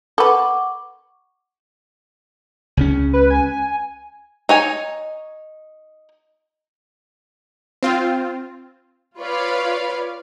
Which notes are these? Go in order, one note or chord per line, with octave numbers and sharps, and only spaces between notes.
A4 B4 F#5 C#6 D6
C#2 C#3 C#4
B4
G#5
D#4 C#5 G#5
C4 F4
F4 B4 C#5 D5 F5